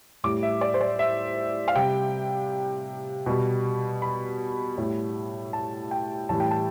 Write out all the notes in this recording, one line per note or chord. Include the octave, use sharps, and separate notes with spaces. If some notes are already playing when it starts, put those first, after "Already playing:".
A2 G3 D6
E5
D5
C5
D5
E5
F5
C3 G3 G5
B2 G3
B5
A2 G3
A5
G5
A2 E3 G3 A5
G5
A5